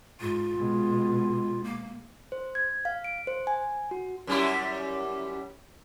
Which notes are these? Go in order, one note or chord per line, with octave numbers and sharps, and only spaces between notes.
G#2 F4
B2 G#3
A#3
C5
G#6
F5
D7
C5
G#5
F#4
F#2 G3 E4